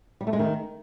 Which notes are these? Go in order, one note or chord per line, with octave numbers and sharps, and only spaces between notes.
G3
A3
G#3
D#3